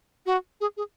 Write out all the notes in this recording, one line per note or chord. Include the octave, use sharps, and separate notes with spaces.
F#4
G#4
G#4